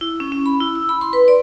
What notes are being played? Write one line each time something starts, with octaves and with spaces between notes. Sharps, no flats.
E4
C#4
C#4
B5
E4
E6
B5
C6
B4
D5